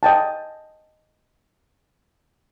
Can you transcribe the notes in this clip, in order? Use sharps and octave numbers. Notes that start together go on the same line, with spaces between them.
D#5 G5 A5